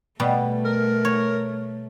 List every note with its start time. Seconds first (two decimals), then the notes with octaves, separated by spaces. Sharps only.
0.20 B2 G3 A3
0.65 A#4
1.05 C#5